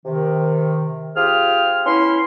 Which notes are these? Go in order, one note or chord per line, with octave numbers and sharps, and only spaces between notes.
C3 D#3
C4 F4 G4 G#4 F6
B3 C#4 E4 C6